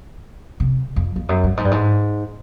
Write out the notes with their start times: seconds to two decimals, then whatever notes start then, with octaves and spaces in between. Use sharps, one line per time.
0.60 C3
0.96 F2
1.16 F2
1.29 F#2
1.44 G2
1.57 G#2
1.65 G2
1.71 G#2